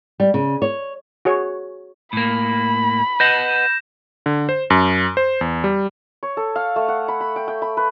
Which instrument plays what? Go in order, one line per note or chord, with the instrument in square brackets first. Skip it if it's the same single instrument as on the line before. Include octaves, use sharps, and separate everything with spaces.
[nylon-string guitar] G3
C#3
C#5
[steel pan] F#4 G#4 C#5
[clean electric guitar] A2 A#3 [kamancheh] B5
[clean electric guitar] B4 D#5 F#5 [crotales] G6 A#6 E7
[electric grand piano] D3
C5
F#2
C5
E2
G3
[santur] C#5
A4
F5
A3
F#5
B5
B5
G5
G5
B5
B4